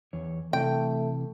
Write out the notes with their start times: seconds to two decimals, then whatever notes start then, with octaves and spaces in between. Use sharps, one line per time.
0.13 E2 C#5
0.53 C3 E3 A3 G5